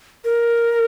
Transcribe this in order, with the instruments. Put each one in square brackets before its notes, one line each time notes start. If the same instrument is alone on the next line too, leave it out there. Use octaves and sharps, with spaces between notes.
[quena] A#4